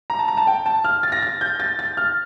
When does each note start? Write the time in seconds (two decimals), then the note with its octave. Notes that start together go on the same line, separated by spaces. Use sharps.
0.10 A#5
0.19 A5
0.28 A#5
0.37 A5
0.47 G5
0.66 A5
0.84 F6
1.03 A6
1.12 A#6
1.22 A6
1.41 G6
1.60 A6
1.79 A6
1.97 F6